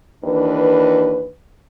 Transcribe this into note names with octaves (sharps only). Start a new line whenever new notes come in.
D#2 E3 D4 B4